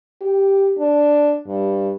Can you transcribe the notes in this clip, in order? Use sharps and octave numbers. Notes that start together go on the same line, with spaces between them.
G4
D4
G2